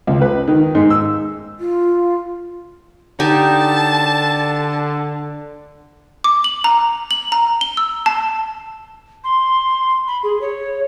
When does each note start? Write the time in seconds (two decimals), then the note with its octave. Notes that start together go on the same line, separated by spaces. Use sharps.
0.07 C#2
0.22 B4
0.48 D#3
0.75 G#2
0.90 E6
1.59 F4
3.20 D3 D#4 G4 G#5 A5
6.24 D6
6.44 F#7
6.64 A#5
7.11 F#7
7.32 A#5
7.61 G7
7.77 E6
8.06 A5
9.24 C6
10.07 B5
10.23 G#4
10.41 C#5